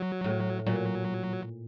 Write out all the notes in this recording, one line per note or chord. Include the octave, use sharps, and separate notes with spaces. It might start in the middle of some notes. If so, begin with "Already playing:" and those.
Already playing: F#3
A2
A#2 F#3